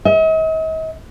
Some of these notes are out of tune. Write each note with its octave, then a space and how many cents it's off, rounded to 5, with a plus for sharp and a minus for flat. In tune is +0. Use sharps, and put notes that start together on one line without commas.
D#5 +45